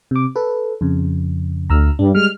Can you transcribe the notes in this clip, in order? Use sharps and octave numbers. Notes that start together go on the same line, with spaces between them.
C3 D6
A4 B4
F2 C#3
D2 A#5 E6 F6
G2 D4
G3 G#3 F6